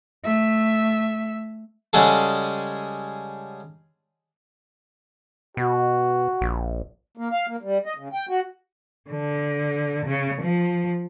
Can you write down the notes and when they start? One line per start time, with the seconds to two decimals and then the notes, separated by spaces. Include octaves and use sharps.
0.24 A3 E5
1.93 C#3 G3 G#3 F#4 G#4 A4
5.57 B2 F#4
6.41 A#1
7.17 A#3
7.32 F5
7.48 A#3
7.62 G3
7.86 D#5
7.98 C#3
8.13 G5
8.29 F#4
9.10 D3
10.05 C#3
10.42 F3